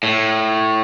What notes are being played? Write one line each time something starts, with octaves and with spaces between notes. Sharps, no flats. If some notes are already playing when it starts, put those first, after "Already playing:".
A2